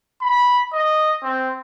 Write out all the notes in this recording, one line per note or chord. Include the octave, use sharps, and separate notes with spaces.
B5
D#5
C4